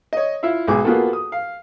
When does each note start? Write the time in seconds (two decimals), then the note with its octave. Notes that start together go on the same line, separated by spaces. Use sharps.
0.13 C#5 D#5
0.43 E4 F4 E5 F5
0.67 B1 G#2 G#4 D6
0.85 A#3 B3 F4 F#4 G#4 A4
1.13 D#6
1.32 F5